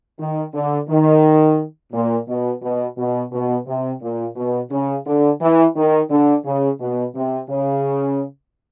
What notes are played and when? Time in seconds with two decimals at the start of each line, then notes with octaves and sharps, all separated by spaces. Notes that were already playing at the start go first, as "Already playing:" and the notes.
0.20 D#3
0.54 D3
0.89 D#3
1.93 A#2
2.28 B2
2.62 B2
2.98 B2
3.32 B2
3.67 C3
4.02 A#2
4.36 B2
4.71 C#3
5.07 D3
5.41 E3
5.76 D#3
6.11 D3
6.45 C#3
6.80 B2
7.15 C3
7.50 C#3